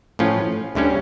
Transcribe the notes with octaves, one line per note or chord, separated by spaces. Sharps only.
A2 F3 C#4 F4
D2 D3 G3 C#4